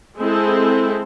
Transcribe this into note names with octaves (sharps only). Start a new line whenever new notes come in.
G#3 C4 E4 A4